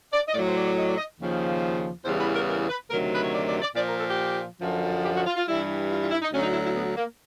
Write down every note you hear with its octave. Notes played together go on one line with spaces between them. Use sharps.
D5
D#5
A2 F#3 D5
C5
D5
D5
D#5
D5
D#5
D#2 C#3 F3
E2 C#3 E3 G3 C5
B4
A#4
A#4
B4
D2 C3 D#3 F#3 A#4
B4
C#5
D5
D5
D5
A#2 F3 D5
A#4
A4
G4
F#2 D3 F3
G4
F#4
F4
F4
G2 E3 G3 E4
F4
F4
E4
D#4
D2 D3 F#3 C#4
D#4
E4
E4
B3
A#3